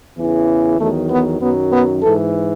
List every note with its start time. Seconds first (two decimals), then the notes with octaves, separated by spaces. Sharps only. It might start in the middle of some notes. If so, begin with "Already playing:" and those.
0.16 E2 C#3 E3
0.78 E2 D#3 F#3 A3
1.09 B3
1.40 F#2 D#3 F#3 B3
1.72 B3
2.02 G#2 E3 A4